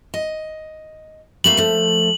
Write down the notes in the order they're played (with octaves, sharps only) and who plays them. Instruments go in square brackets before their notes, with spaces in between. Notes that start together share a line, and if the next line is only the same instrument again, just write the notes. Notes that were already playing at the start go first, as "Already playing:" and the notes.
[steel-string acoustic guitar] D#5
[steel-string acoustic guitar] G3 A3 A#3 [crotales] F#7
[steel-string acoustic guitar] F3 A3